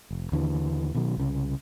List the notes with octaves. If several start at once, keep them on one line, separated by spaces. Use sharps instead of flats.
F1
D#2 D3 E3
B2 D#3 F#3
C2 C#3